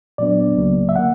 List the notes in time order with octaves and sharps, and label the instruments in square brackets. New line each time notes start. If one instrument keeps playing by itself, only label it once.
[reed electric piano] A#2 F#3 B3 D4 D5
C#2 C#3 F#3 A#3
E5
D3 A#3 F#5